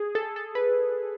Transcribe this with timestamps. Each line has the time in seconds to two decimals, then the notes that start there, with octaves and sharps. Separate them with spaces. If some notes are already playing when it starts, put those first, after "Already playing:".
Already playing: G#4
0.15 A4
0.36 A4
0.55 B4